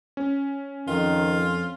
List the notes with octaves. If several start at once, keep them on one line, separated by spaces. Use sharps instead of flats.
C#4
F2 D#3 F4